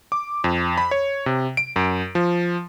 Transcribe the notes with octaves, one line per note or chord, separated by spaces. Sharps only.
D6
F2
B5
C#5
C3
D7
F#2
F3